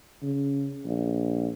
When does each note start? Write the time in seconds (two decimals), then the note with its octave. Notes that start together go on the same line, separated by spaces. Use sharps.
0.22 C#3
0.85 A#1